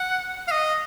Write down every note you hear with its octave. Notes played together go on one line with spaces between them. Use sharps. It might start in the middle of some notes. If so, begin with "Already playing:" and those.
Already playing: F#5
F5
D#5